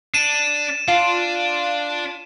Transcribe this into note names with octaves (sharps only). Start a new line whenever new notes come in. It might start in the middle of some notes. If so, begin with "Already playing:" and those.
D4 D#7 E7
D4 F4